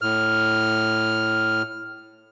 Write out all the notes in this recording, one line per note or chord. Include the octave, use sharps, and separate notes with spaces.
A2 F6